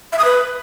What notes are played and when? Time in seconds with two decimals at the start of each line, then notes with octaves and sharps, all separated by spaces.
0.12 E5
0.19 D#6
0.25 B4